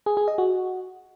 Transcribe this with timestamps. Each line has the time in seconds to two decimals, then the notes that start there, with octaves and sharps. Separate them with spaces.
0.06 G#4
0.17 G#4
0.28 D#5
0.38 F#4